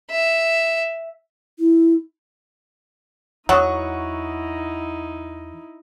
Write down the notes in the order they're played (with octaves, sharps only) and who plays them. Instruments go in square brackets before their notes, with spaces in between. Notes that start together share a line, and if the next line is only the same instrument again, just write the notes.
[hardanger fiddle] E5
[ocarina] E4
[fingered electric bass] E2 [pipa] F#3 [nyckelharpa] D#4 E4 [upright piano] F#5 C#6 D#6